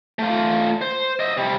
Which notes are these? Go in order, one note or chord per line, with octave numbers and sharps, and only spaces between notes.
A3 F4
C5
D#5 E5
C3 G3